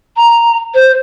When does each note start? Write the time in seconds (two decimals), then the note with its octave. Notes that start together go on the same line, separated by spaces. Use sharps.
0.17 A#5
0.74 C5